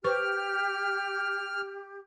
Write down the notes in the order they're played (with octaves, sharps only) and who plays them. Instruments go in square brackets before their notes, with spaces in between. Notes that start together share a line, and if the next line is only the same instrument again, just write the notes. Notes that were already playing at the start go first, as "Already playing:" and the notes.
[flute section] G4 [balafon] B4 C5 C#6 [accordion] F6